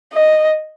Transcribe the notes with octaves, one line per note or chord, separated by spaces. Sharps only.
D#5